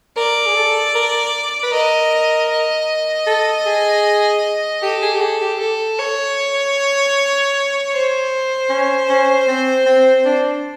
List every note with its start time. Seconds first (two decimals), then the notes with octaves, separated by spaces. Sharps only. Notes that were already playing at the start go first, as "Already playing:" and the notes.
0.17 A#4 D5
0.46 G#4
0.56 A4
0.95 A#4
1.63 B4
1.72 A#4 D#5
2.49 D#5
3.27 A4
3.66 G#4
4.82 G4 A4
5.02 G#4
5.13 G4
5.21 G#4
5.41 G4
5.60 A4
5.99 C#5
7.93 C5
8.69 C#4
9.09 C#4
9.48 C4
9.86 C4
10.25 D4